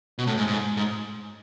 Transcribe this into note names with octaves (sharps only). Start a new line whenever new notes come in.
B2
A2
G#2
G#2
G#2